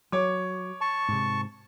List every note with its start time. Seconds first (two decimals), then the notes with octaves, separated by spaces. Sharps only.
0.12 F#3 C#5 D6
0.81 A5 C#6
1.08 G#2 C3